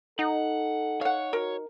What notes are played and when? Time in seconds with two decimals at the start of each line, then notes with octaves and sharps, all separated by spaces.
0.19 D#4 A4 F#5
1.01 C#5 F5 F#5
1.33 F#4 A#4